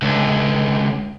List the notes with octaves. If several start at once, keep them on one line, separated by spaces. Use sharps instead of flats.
C#2 D3